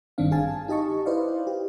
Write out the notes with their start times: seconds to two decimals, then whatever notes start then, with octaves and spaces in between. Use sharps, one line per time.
0.18 G#1 G2 D#3 C4 D4 F5
0.31 G#4 F5 G#5 A5
0.68 D#4 G4 D#5 A5 C#6
1.06 E4 B4 C5 D5 D#5 F5
1.47 G4